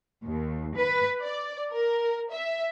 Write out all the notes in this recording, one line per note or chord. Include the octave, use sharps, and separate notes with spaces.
D#2
B4
D5
A#4
E5